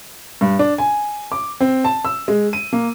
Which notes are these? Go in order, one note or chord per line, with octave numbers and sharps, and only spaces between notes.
G2
D4
G#5
D6
C4
A5
E6
G#3
D#7
A#3